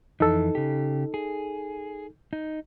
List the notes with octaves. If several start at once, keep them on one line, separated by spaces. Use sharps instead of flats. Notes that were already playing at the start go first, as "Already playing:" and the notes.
F2 E3 D#4 A4
C#3 G4
G#4
D#4